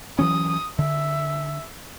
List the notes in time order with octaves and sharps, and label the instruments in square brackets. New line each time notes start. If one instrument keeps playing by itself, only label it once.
[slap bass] E3 F#3 C#4 [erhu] D#6
[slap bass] D3 [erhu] E5